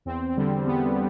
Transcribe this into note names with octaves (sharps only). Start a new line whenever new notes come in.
E2 C4
D3 G3
E2 B3